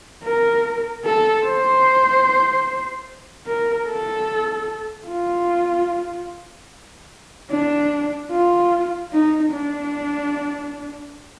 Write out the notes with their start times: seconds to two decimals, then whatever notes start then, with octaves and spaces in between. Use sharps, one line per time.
0.24 A#4
1.05 A4
1.45 C5
3.46 A#4
3.87 A4
5.08 F4
7.51 D4
8.31 F4
9.12 D#4
9.52 D4